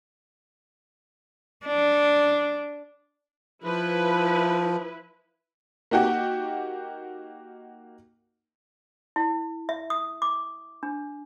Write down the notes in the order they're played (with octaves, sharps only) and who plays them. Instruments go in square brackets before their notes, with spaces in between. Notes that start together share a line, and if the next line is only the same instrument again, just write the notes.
[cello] D4
[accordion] F3 [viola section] E4 B4
[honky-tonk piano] A#3 D#4 F#4 G4 F#5 G5
[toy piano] E4
E5
D#6
D6
D4